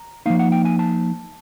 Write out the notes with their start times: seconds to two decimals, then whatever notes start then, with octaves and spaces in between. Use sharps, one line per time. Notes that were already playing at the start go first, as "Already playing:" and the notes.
Already playing: A#5
0.26 F3 A#3 D#4 F5
0.39 F#5
0.52 G5
0.65 G#5
0.79 A5